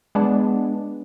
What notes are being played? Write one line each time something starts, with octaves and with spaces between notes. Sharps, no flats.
G#3 B3 D4